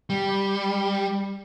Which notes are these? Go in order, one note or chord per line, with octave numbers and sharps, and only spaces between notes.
G3